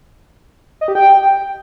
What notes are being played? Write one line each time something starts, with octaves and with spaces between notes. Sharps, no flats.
D#5
G4
G5